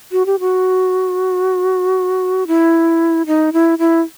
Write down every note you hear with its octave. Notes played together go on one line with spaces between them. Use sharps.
F#4
G4
F#4
E4
D#4
E4
E4